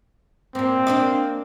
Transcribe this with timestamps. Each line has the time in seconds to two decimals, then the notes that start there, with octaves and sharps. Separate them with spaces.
0.55 A#2 A#3 C4
0.87 A#3 D4 D#5